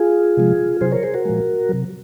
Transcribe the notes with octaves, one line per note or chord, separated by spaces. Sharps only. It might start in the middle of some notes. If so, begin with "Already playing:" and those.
Already playing: F4 G#4
C3 F3 G#3
C3 F#3 G#4 C5
A#4 C#5
G#4 C5
F#4 A#4
A#2 F3 G#3
C3 F#3